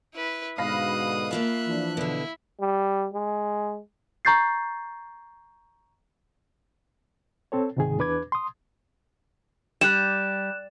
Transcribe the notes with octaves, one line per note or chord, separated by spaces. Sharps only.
E4 B4
G#2 B2 D3 F5 B5 D#6 F#6 A#6
A#3 F4 E5 A5 F#6
E3 F3 D4
B2 D3 E4
G3
G#3
A#5 C#6 G6 A6 C7
C4 A4 C#5
C#2 G#2 C3 D#3 G#4
E2 D4 B4 D6 G#6
C6 D#6
G3 F#6 E7